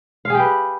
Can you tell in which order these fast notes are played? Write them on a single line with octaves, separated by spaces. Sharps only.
F5 G#4 G4 B4